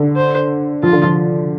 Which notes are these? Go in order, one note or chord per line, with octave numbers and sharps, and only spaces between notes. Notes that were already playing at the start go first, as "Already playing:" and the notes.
Already playing: D3
C5
F3 F4
D3
F3